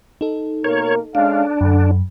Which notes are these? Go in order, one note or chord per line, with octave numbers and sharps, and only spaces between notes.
D#4 A4
B2 A#3 A#4 C#5
G#3 C#4 D4 F5
F#2 D3